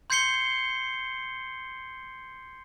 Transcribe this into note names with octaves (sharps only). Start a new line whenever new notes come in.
C6 G6 G#6 C7 C#7 G7